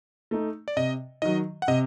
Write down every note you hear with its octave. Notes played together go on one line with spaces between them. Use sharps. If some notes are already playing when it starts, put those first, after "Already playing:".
A3 D#4
D5
C3 D#5
D#3 F#3 D#5
F#5
C3 D#5